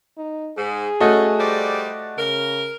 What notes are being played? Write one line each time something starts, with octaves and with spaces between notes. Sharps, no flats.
D#4
G#2 G#4
A3 C#4 F#4 D#5
G3 C5 D5
C#3 A#4